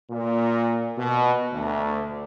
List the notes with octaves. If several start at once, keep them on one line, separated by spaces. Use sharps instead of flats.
A#2
B2
D2